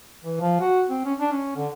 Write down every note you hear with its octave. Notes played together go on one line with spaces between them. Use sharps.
E3
F3
F#4
C4
C#4
D4
C#4
D3